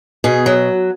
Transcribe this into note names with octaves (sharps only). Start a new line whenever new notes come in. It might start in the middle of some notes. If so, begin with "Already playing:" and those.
B2 G#4
F#3